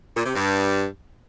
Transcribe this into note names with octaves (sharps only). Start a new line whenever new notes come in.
A#2
C3
G2